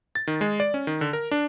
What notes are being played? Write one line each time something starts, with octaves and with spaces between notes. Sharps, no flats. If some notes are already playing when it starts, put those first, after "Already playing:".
A6
D#3
G#3
D5
C#4
D#3
D3
A#4
D4